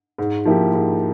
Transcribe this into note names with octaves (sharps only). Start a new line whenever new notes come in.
G#2
F3 A#3 E4 G4
G#2